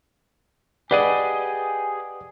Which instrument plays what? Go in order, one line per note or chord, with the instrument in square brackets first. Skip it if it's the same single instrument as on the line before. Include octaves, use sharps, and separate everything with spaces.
[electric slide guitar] G4 G#4 D#5 [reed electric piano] B4 F#5 [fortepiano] D5 [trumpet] G#5